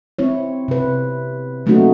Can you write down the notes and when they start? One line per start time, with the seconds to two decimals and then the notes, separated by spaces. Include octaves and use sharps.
0.19 C4 E4 C#5
0.68 C3 B4
1.66 F#3 A3 A#3 C#4 D#4 F#4